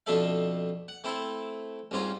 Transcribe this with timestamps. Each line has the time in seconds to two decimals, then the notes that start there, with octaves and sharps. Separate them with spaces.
0.06 F2 B2 D4 A4 E5 F5
0.88 F#5
1.04 A3 C4 E4 A4
1.91 C2 G#2 C#4 F4 C#5 A#5